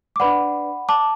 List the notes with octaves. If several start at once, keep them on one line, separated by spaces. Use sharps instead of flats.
D6
D4 B4 D5 F#5 B5
A5 D6